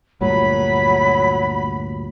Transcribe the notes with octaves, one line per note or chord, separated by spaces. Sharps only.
D2 G2 A#2 F#3 B5